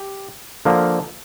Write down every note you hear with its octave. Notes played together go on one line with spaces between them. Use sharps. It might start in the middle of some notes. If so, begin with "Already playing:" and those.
Already playing: G4
D3 F3 A#3